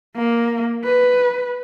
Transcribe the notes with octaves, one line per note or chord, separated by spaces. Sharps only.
A#3
B4